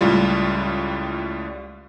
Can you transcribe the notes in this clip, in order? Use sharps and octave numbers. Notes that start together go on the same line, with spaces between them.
C#2 A2 G3 F4